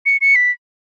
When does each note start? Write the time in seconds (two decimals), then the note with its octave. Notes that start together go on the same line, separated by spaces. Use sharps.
0.06 C#7
0.21 C#7
0.36 B6